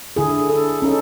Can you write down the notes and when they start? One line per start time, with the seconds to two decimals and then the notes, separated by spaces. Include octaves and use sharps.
0.16 D3 E4 G#4
0.50 A4
0.82 C#4 D#4 A4